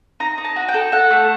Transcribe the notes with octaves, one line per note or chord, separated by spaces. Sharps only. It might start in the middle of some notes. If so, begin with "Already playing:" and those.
D#4 A#5
D#4
A5
F#4
G5
A4
A4 F#5
A3